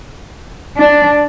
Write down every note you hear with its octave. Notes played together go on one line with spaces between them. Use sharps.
D4